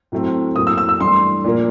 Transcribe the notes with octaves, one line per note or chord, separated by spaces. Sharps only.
A2 F#3 A3 C4
A2 F#3 A#3 D#6
E6
E6
E6
G2 E3 A3 C6
A#2 F3 A#3